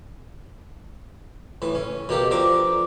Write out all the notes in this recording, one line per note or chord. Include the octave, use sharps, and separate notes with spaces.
A2 E3
C#4
B2 A#3 G4 A4
F3 D4 A#5 D6